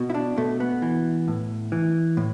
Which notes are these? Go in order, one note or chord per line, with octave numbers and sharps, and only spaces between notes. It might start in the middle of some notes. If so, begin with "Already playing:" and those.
Already playing: B2
E4
D4
B2 A3
B3
E3
A2
E3
A2